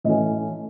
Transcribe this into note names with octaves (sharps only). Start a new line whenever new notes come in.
A2 E3 A3 C#4 D#5